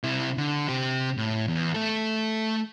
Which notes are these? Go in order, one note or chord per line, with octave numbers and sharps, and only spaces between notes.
C3 E4
D3
C3 G4
A2
E2
A3 A4